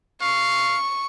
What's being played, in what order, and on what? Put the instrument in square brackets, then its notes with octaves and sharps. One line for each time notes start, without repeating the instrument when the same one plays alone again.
[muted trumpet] F5 [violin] C#6